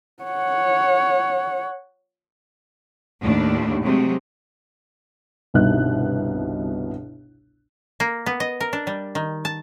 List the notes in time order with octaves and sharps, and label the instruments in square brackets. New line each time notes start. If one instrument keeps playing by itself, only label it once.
[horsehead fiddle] C#5 F#5
[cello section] D#2 A2 D4
C3 F#3 G#3 A3
[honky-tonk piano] G1 C2 B2 D#4 F#6
[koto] A#3
B3
D#5
A#4
D4
G3
D#3
A5